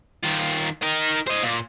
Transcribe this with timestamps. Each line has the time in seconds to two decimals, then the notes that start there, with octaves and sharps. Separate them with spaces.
0.24 D#3 F4
0.83 D#4 A#4
1.28 C5 D#5
1.44 A#2